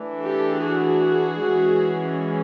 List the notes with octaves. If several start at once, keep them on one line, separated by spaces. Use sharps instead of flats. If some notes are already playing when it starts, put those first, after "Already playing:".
Already playing: E3 A3 D4
G4 A4
F#4 G#4
E3 G#3 C#4